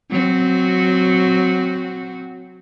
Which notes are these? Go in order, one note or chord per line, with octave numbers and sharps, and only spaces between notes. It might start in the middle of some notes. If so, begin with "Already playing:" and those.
F#3 C4 F#4